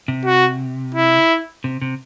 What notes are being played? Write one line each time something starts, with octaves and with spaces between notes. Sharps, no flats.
C3
F#4
E4
C3
C3